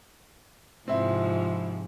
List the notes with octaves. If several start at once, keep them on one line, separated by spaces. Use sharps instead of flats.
G#2 C3 F3 C4 E4